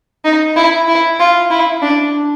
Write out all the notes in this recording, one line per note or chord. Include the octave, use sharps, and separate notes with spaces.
D#4
E4
E4
F4
E4
D4